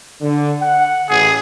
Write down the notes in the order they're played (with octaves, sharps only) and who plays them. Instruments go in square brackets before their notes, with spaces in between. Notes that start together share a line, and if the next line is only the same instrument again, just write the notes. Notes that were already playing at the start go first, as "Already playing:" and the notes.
[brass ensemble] D3
F#5
[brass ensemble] A1 A2 [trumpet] G#4